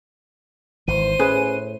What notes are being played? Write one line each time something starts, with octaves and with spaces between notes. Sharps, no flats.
G#1 E3 C5 D#7
A2 C#4 G#4 B4